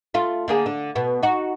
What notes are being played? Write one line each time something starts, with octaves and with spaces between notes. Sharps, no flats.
A3 F4
D3 A#3 G#4
D3
B2 B3
D#4 F#4